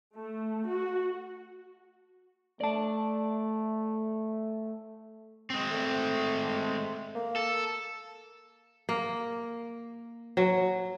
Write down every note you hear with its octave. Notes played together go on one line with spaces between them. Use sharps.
A3
F#4
A3 D5 A5
G#3 C4
A3
A#3
A4
A#3
F#3